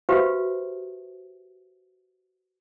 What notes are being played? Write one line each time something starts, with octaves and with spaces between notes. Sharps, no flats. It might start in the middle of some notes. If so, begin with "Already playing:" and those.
F#4 G4 B4 C5 E5 F5